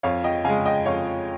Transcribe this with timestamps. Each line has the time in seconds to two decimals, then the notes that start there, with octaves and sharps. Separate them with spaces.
0.03 F2 C#5 F5
0.24 D#5 G5
0.45 C#3 G#3 F5 G#5
0.65 D#5 G5
0.85 F2 C#5 F5